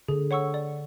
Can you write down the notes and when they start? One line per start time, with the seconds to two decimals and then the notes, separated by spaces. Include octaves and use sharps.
0.08 D3 G#4
0.31 C#5 F#5 C#6 E6
0.54 D5